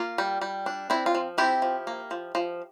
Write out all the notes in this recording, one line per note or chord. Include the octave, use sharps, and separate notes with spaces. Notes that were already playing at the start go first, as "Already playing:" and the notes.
Already playing: A#3 F4
G3
G3
D4
C4 E4
F4
F3
C4 E4 G4
F3
A#3
F3
F3